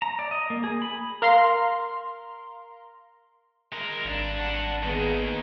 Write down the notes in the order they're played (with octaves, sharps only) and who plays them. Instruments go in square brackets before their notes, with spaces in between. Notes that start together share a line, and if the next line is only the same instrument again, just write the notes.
[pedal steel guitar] A#5
D5
D#5
A#3
G#4
B5
[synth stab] A#4 F5 A#5 C6
[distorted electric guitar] G#3 A#4 [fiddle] A#5
[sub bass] G#1 [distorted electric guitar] G2 D4
[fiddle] F#5 A5
[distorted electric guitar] D#2 D#3 [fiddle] B3 G#4